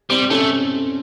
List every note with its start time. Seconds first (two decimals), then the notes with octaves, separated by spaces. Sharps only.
0.10 G3 C4
0.30 A3 C#4